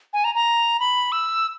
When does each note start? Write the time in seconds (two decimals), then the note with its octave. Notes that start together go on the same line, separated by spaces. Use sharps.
0.13 G#5
0.24 A#5
0.35 A#5
0.80 B5
1.12 E6